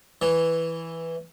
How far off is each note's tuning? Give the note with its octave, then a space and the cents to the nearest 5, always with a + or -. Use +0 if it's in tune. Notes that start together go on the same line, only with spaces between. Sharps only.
E3 +0 C#5 +0